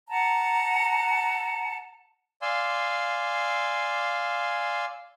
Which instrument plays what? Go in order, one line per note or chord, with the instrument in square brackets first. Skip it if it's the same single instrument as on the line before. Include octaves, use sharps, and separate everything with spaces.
[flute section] F#5 A5 A#5
[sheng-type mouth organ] D5 F5 G#5 C6 E6